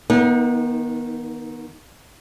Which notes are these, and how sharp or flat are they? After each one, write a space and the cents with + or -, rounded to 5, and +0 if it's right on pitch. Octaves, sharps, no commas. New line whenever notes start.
D#3 +0 B3 -30 D#4 +35